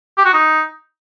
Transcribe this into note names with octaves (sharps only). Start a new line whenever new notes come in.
G4
F#4
D#4